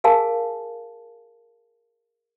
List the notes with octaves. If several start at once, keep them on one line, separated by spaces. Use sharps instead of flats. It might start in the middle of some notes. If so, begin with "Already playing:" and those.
G#4 A#4 F5 G#5 A5